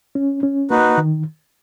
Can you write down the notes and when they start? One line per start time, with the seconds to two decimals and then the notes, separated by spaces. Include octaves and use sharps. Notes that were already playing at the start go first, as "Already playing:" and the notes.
0.15 C#4
0.43 C#4
0.70 A#3 D#4 F#4 B4
0.98 D#3